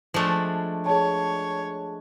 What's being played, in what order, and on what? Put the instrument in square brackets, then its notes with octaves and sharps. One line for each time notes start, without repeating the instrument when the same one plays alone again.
[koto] F3 A3 [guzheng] G#3 D4
[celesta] G#4 A5 [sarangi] C#5